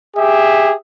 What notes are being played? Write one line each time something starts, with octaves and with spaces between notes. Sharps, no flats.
G4 G#4 E5